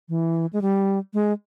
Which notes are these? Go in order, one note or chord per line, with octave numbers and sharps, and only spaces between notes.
E3
G#3
G3
G#3